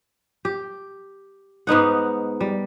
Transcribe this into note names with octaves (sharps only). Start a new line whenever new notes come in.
G4
G#2 B3 D#4 F#5
G3